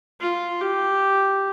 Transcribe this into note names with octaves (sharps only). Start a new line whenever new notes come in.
F4
G4